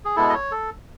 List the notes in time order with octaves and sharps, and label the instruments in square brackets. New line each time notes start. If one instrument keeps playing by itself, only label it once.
[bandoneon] G#4
B2 G#3 B3 E4 A4
D#5
C#5
A4